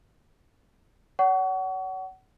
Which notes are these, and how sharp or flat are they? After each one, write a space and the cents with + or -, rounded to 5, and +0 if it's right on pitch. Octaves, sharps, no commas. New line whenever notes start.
C#5 +40 F#5 +25 C#6 +30